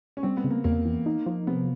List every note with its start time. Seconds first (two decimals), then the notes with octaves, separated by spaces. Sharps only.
0.17 C#4
0.23 G3 C4
0.37 B3
0.44 C#3
0.50 A#3
0.64 E2 A#3
0.85 E3
1.06 D#4
1.26 F3
1.47 C3 B3